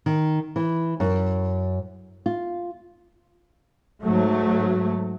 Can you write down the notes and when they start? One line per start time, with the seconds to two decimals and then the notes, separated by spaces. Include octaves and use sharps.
0.06 D#3
0.56 E3
1.00 F#2
2.26 F4
4.01 G#2 F#3 A3